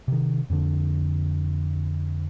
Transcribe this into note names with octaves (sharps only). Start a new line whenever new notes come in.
C3 D#3
F2 D3